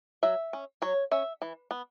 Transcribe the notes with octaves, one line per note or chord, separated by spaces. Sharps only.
F#3 E5
C#4
F#3 C#5
C#4 E5
E3
B3